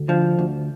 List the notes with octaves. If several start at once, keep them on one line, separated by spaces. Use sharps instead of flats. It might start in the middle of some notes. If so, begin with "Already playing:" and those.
Already playing: D2
D3 F3
D2